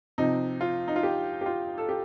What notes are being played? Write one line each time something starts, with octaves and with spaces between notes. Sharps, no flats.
C3 F3 C4 D#4
F4
D#4
F4
G4
G4
F4
A4
G4